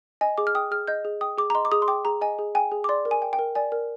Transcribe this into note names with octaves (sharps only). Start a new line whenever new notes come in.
D#5 G#5
G#4 D6
F6
G5 D#6
G#4 F6
D#5 G6
G#4
G5 D#6
G#4 D6
A#5
D#5 C6
D6
G#4 D#6
C6
G5 D6
G#4 A#5
D#5 G#5
G#4
G5 G#5
G#4
D6
D5 C6
A#4
G#5
G5
G5
A#4
D5 G#5
A#4